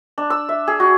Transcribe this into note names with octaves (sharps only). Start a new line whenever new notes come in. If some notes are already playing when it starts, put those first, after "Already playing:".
D4
E6
E5
G#4
F#4